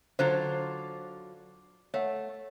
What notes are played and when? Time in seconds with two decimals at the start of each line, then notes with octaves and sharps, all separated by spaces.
0.19 D3 F#3 F4 C5
1.94 A3 C#5 F#5